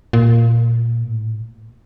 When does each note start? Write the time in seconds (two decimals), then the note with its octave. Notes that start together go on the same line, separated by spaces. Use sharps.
0.13 A#2
1.03 A2